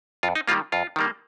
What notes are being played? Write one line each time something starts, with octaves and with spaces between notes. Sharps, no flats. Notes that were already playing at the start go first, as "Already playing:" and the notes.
F2 F4
D#4
D#3 G3 A#3 F4
F2 F4
D#3 G3 A#3